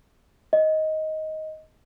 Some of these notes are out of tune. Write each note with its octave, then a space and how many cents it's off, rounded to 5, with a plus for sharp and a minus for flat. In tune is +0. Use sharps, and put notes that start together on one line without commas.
D#5 +10